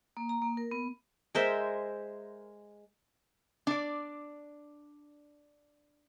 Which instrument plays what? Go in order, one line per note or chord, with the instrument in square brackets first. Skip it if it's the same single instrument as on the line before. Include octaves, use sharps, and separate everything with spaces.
[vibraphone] A#3
A#5
A#3
A#4
B3
[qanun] G#3 A#4 C5 E5
[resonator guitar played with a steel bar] D4 D5